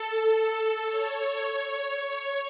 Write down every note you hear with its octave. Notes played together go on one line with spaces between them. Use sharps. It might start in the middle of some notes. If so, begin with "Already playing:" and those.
Already playing: A4
A4
C#5